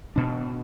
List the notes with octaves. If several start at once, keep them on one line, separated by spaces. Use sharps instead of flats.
B2 D4